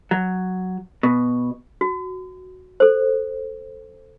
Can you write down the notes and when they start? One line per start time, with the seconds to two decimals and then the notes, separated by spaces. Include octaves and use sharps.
0.11 F#3
1.03 B2
1.81 F#4
2.80 A4 C5